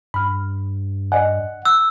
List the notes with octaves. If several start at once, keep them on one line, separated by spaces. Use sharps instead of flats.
G2 B5 F6
D5 D#5 F#5 G#5
E6 F#6